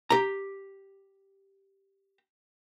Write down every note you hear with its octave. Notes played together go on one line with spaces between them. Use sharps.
G4 A#5